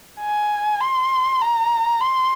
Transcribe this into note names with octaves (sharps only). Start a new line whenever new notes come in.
G#5
C6
A#5
C6